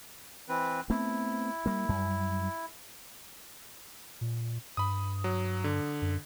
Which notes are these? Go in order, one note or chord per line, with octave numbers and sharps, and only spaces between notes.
E3 C4 B4
A3 B3 C4 E4
G3 A#3
F#2 G3
A#2
G2 B5 D#6
F#3
D3
F#2